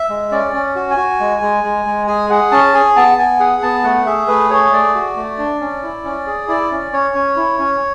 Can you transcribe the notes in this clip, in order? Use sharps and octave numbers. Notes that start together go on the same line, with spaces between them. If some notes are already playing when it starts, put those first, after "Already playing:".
Already playing: E5
G#3
C#4 D5
C#4
F#4
G#5
F#4
G#3
G#3
G#3
G#3
G#4 G#5
G#4 F#5
C#4 A5
G#4 G#5
B3 A5
B3 G#5
G#4 F#5
B3 A5
A3 F#5
G#4 E5
A3 B4
G#4 C#5
A3 D5
F#4
A3
D4
C#4
E4
C#4
G#4
E4 D5
C#4
C#4 C#5
C#4
E4
C#4